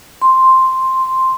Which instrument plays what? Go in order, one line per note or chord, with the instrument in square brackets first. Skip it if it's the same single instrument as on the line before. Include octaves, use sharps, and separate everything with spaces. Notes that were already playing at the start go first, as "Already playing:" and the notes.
[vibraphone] C6